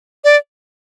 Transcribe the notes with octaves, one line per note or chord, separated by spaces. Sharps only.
D5